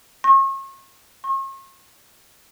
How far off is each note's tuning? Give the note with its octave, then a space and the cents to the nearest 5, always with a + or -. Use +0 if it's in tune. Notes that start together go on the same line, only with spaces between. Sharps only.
C#6 -40
C#6 -45